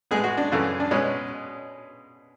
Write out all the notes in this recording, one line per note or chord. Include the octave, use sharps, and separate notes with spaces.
A2 G#3 B3 G#4
F#4
D4
F#2 C#3 E3 A3
D4
B2 G#3 B3 C#4